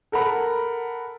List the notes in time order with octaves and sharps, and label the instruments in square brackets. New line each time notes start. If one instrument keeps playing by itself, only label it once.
[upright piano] A4 A#4 F#5 B5